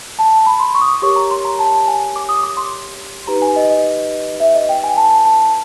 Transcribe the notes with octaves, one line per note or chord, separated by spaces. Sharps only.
A5
B5
C6
C#6
D#6
D6
G4 A#4 C#5 C#6
A#5
C6
A#5
A5
G#5
D6
D#6
D6
C6
D#4 G4 B4 A#5
G#5
D#5
D#5
E5
D#5
G5
G#5
A5
A5